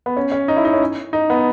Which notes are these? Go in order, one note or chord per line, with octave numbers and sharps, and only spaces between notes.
B3
C#4
C#4
D#4
E4
D#4
C#4
D#4
B3